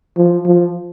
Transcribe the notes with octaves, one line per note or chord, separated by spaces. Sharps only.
F3
F3